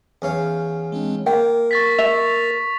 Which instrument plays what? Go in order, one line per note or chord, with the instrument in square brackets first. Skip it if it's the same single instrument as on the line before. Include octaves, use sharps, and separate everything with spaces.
[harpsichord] E2 C#4 F5
[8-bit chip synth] G#3 C4 D4
[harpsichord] A#3 [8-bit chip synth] A#4 [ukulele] G5
[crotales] C#6 A6 B6
[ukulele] E5 [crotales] F7